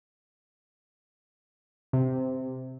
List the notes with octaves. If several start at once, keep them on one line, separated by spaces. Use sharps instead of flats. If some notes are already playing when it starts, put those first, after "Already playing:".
C3